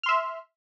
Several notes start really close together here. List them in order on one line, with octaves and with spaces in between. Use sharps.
F6 C6 E5